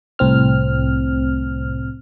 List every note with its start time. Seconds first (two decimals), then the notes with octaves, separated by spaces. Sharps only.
0.19 C2 A2 C4 F6